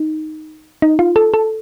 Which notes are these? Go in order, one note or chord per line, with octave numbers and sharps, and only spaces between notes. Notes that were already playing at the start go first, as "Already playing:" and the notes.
Already playing: D#4
D#4
F4
A4
A4